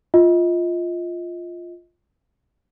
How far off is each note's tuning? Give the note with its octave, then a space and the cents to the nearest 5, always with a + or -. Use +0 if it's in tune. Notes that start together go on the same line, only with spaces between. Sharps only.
F4 +0 D#5 +30